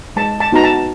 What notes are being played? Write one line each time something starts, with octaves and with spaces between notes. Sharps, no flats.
G#3 A5
A5
B3 D#4 F#4 A#5
A5